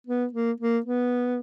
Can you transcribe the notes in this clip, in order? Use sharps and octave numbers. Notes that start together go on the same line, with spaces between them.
B3
A#3
A#3
B3